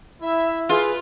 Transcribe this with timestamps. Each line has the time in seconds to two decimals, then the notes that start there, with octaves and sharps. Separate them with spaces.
0.22 E4 E5
0.69 F4 G#4 B4